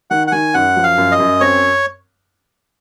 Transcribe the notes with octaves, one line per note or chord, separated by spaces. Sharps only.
D#3 F#5
F#5
D#3 G#5
F#2 F#5
F3
F5
F#2
D#5
F#2
C4 C#5